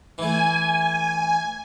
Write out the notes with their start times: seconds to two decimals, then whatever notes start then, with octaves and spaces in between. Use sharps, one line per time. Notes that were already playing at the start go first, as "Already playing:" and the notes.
0.18 E3 A3 G#5